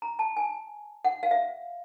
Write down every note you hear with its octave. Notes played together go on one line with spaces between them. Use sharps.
A#5
A5
G#5
F#5
F5
E5